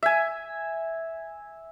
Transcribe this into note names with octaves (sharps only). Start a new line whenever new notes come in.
E5 G#5